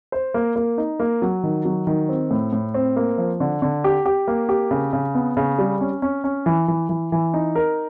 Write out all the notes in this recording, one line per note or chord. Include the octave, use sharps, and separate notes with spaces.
C5
A#3
A#3
D#4
A#3
F#3
D#3
F#3
D#3
C4
A2
A2
C4
A#3
F3
D3
D3
G4
G4
A#3
G4
C#3
C#3
B3
C#3
G3
C#4
C#4
C#4
E3
E3
E3
E3
D#4
A#4